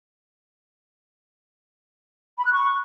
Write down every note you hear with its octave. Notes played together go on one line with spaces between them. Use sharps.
B5
F#6
C#6